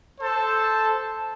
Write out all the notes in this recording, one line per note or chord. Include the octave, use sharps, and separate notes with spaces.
A4 C5 A5